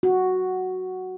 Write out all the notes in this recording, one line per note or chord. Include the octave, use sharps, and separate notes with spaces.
F#4